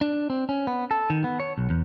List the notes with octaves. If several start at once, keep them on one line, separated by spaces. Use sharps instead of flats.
D4
C4
C#4
B3
A4
D#3
B3
C#5
B1
E2